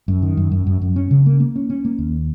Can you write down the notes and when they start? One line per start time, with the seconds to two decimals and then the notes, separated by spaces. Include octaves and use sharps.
0.08 F#2
0.22 D#3
0.37 F#2
0.51 F#2
0.67 F#2
0.82 F#2
0.96 C#4
1.11 C#3
1.26 A#3
1.40 A#3
1.56 C#4
1.70 C#4
1.85 A#3
1.99 D#2